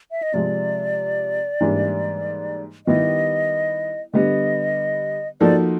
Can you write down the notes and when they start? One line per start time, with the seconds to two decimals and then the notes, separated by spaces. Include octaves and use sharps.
0.11 E5
0.23 D#5
0.34 C3 F3 G#3 D5
1.61 G#2 E3 G3 A#3 D4
2.87 D#3 G3 B3 E4 G4 D#5
4.14 D3 G3 B3 D#5
5.40 F3 A#3 D#4 F#4 A4 D5